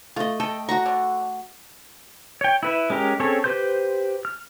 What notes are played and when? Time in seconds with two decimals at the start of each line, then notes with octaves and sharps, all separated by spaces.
0.16 A3 F4 D#5
0.40 A4 D#5 G5
0.69 F#4 F#5 A#5 C#6
0.86 D3
2.41 C#5 G5
2.63 E4 B4 E5
2.90 G#3 C#4 G4 A#4
3.20 C4 C#4 G#4 A4 C#5
3.44 G4 B4 C5 C6 G6
4.25 F6